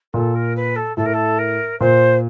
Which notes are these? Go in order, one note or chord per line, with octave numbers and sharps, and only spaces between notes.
A#2 A4
A#4
B4
A4
A2 A4
A#4
A4
A#4
A#2 C5